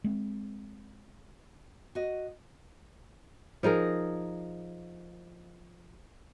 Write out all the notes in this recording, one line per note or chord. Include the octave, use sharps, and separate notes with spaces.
G#3 C4
F#4 D#5
F3 D#4 G#4 A#4